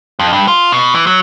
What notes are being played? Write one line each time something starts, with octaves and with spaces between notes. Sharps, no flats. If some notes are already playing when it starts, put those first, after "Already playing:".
F2
G2
F4
B2
E3
F#3